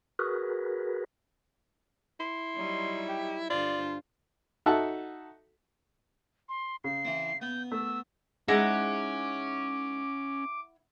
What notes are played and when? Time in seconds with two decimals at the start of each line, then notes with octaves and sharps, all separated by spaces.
0.19 F#4 G#4 A#4 B4
2.20 E4 C6
2.56 F#3 G3 D#4
3.09 G4
3.50 G2 D3 F4 C5 D5
4.66 D#4 F#4 A4 E5 F#5 A5
6.49 C6
6.84 C#3 C7
7.05 E3 C4
7.42 B3 G6
7.72 A3 E6
8.48 G#3 C#4 D#4 E4 G#4 F#5 A#5 D6